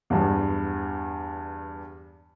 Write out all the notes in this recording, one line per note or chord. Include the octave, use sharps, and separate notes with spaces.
E2 G2